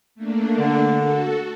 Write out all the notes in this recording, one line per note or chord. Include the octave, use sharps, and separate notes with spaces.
A3 A#3 D4
D3
F#4 A4